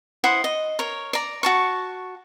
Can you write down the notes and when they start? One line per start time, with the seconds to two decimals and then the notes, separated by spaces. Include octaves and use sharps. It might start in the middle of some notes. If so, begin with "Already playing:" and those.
0.24 E4 C5 F#5 D#6
0.44 D#5
0.79 A#4 C#5
1.13 D5 A#5
1.43 F#4 A5 C#6